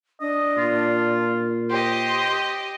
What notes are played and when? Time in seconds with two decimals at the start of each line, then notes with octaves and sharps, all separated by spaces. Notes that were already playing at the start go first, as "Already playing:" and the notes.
0.21 D4 D#5
0.57 A#2 F4
1.70 G4 C5 D#5 C6